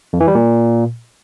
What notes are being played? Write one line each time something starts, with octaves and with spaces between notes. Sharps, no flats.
F2
E3
G3
A#2